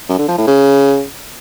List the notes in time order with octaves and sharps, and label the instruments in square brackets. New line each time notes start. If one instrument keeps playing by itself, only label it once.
[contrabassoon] F#2
D3
F3
A2
C#3